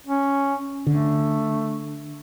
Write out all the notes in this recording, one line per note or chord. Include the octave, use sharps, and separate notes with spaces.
C#4
D3 A3